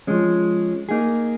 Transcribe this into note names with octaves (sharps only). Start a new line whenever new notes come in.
F3 G#3 C#4
A#3 D#4 G#4